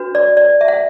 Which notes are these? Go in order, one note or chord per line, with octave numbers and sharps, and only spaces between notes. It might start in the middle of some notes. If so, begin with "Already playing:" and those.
Already playing: D4 F#4 B4
D5
D5
E5
F#5